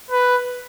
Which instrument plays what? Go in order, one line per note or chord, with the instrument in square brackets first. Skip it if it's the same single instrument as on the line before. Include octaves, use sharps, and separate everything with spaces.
[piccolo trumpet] B4